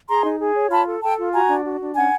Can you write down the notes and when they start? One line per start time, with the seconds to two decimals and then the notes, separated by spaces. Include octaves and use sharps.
0.08 G#4 A#5 C6
0.24 D#4
0.40 G#4
0.56 C#5
0.71 F4 A5 B5
0.87 A4
1.03 A4 G5 A5
1.18 F4
1.34 F#4 G#5 A#5
1.50 D4
1.65 F#4
1.81 D4
1.96 C#4 F#5 G#5